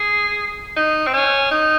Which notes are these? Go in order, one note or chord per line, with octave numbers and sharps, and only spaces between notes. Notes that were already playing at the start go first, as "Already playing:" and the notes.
Already playing: G#4
D#4
C4
C#4
D#4